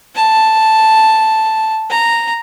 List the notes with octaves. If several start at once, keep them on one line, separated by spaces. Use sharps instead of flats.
A5
A#5